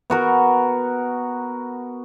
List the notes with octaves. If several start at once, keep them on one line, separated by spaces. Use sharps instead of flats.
B3 F#4 A#4